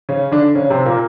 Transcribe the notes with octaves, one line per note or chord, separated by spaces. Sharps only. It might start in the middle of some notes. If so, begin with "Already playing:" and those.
C#3 C#4
D3 D4
C#3 C#4
C3 C4
A#2 A#3